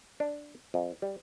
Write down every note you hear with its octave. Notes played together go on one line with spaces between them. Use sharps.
D4
F2
G3